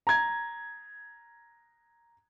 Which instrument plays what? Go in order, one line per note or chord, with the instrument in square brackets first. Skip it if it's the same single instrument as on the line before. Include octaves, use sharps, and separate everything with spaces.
[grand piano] A#5 G#6